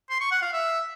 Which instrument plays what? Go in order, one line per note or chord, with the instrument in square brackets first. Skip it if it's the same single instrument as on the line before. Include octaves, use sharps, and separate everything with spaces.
[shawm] C6
C#6
F#5
F5
E5